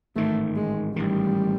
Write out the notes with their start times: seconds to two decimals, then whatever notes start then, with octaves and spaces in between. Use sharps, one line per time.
0.16 A1 G#2 D#3 A3
0.56 G#3
0.96 A1 G#2 D#3 G3